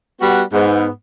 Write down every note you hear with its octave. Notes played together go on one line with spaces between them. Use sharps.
G3 B3 F#4 F#5
G#2 B3